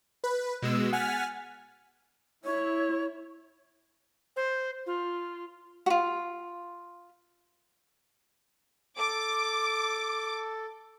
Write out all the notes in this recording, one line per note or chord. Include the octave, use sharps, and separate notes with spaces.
B4
B2 G#3 E6
F#5 G#5 F6 A6 B6
E4 C#5
C5
F4
F4 F#4
A4 D6